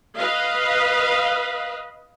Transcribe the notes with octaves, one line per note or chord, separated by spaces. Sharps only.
B4 D#5 F5